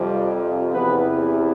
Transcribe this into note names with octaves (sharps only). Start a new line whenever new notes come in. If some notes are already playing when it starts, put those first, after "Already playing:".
Already playing: F2 C3 F3 G3 G4
E2 C3 E3 B3 B4